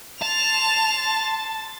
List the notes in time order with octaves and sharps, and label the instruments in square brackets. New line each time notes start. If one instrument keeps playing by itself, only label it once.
[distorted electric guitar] A5 [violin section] C6 A6 [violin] F7